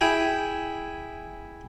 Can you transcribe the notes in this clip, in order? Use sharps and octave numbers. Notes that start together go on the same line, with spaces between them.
E4 G#4 G5 G#5